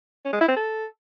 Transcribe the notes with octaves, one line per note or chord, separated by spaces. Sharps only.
C#4
G#3
E4
C4
A4